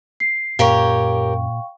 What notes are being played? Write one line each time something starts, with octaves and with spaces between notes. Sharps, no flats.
C7
F#2 A#2 G4 A#4 C#5 F5 G5 C#6